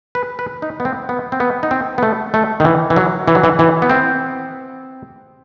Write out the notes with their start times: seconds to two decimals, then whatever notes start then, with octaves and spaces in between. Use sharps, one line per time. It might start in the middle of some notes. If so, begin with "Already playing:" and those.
0.15 B4
0.39 B4
0.62 D#4
0.80 B3
0.85 C4
1.09 B3
1.32 C4
1.40 B3
1.63 D#4
1.71 C4
1.98 B3
2.03 A3
2.34 A3
2.60 D#3
2.65 E3
2.90 E3
2.96 F#3
3.28 E3
3.35 F#3
3.43 E3
3.59 E3
3.82 B3
3.90 C4